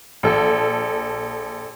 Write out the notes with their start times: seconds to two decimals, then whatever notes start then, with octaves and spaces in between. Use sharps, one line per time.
0.23 A#1 A4